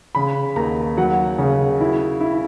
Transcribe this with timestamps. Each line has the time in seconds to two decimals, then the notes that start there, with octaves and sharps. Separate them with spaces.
0.15 C#3 B5
0.56 D#2 A#5
0.97 F#3 F#5
1.38 C#3
1.81 E4
2.21 E4